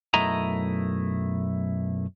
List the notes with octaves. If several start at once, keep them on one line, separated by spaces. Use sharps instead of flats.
B1 F#2 A3 E4 D#5 A#5